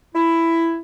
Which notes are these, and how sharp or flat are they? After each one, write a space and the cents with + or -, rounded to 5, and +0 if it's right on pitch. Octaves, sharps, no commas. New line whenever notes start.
E4 +10